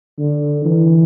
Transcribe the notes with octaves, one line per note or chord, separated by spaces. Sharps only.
D3
E3